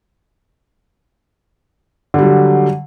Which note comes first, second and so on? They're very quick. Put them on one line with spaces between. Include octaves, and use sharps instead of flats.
D3 G3 F#3